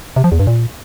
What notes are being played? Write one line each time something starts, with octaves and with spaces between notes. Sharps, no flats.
C3
F3
E2
G2
A#2